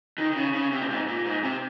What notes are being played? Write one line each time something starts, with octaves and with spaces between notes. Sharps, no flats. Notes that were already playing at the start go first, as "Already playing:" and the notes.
D#3
D#3
C#3
C#3
C3
A#2
G#2
A#2
G#2
C3